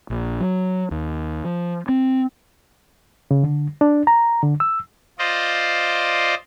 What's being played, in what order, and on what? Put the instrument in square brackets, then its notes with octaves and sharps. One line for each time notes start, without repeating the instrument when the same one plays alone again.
[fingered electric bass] A#1
F#3
D#2
F3
C4
[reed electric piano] C#3
D3
D4
A#5
D3
E6
[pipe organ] F4 C5 D5 D#5